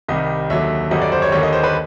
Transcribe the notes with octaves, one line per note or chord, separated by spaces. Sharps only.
C2 C3 D#3 G3 D#5
D#2 D3 F#3 E5
G#1 F#2 D3 G3 D#5
D5
C5
C#5
D#2 D3 G3 A#3 C#5
D#5
C5
B4